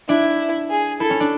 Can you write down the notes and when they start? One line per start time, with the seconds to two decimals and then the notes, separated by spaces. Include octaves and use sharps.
0.08 D4 E4
0.70 G#4
1.00 E4 A4
1.10 C#4
1.20 D4